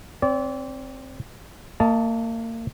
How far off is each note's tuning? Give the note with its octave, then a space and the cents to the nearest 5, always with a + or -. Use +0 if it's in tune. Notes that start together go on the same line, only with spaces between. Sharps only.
C4 +10 D5 -35
A#3 -35 D#5 +0 A5 +0